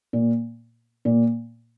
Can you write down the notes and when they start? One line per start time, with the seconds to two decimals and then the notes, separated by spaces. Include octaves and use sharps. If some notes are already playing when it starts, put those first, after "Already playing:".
0.13 A#2
1.05 A#2